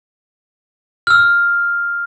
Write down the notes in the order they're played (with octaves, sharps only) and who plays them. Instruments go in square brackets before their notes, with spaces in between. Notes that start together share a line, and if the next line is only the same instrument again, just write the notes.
[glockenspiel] E6 F6